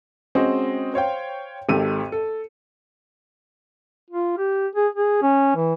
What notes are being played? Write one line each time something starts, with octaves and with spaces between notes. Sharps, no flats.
G#3 C4 C#4 F#4 C5 D#5
C5 C#5 F5 G5
G#1 G#2 G4 A4 E6 D#7
A4
F4
G4
G#4
G#4
C#4
E3